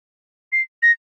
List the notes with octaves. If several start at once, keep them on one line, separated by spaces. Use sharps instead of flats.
C7
A#6